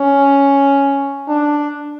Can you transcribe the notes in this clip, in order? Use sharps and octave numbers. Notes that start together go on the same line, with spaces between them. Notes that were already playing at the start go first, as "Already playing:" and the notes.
Already playing: C#4
D4